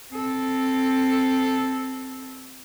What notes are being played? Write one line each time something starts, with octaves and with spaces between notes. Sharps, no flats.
C4 A4